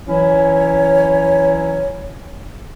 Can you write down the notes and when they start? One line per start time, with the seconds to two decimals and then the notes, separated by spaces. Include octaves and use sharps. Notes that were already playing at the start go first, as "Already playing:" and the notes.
0.08 E3 F#3 C#4 E4 C#5